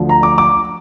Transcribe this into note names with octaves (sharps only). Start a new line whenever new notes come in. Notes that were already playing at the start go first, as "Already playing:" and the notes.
Already playing: D2 D3 F3
A#5
D6
D6